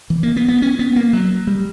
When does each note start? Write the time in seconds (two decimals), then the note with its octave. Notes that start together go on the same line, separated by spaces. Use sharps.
0.10 E3
0.23 A#3
0.37 B3
0.48 B3
0.62 C#4
0.79 B3
0.96 A#3
1.13 F#3
1.47 G3